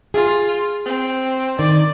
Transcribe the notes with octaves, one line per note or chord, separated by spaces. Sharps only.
F4 G#4
C4
D#3 D5